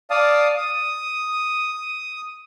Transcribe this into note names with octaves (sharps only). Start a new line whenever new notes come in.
D5 F5 A5 D#6
D#6